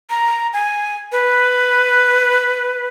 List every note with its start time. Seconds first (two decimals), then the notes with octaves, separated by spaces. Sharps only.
0.10 A#5
0.53 G#5
1.12 B4